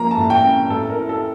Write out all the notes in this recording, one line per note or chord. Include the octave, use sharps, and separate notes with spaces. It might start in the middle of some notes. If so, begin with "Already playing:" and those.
Already playing: F3 A#3 C#4 A#5
A5
A2
G5
C#4
A2 A4
A#4
E4
A4